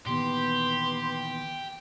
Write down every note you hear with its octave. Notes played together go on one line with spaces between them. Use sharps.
A#2 D#3 E3 B3 G4 C6